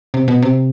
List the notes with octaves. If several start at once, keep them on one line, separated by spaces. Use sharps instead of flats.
C3
B2
C3